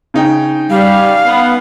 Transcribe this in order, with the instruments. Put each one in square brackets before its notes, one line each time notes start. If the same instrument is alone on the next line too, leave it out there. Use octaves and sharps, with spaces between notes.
[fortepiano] C#3 D#4 G5
[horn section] G3 [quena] F5
[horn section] B3